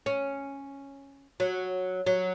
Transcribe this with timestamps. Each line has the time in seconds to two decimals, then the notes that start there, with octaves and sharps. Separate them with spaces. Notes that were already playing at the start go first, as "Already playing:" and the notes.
0.06 C#4
1.40 F#3
2.06 F#3